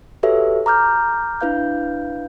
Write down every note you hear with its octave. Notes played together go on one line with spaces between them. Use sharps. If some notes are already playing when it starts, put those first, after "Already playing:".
F#4 G4 A4 B4 C#5 E5
A#5 D6 F6 G6
D4 E4 B4 F5 G6